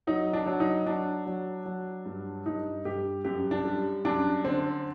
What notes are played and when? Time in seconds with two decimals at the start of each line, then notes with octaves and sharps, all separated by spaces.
0.07 F#3 D#4
0.33 D4
0.46 F#3
0.60 D#4
0.86 F#3 D4
1.26 F#3
1.65 F#3
2.06 G2
2.46 G2 D#4
2.85 G2 G4
3.24 F#2 G4
3.51 D4
3.65 G3
4.05 F#2 D4
4.44 D3 C4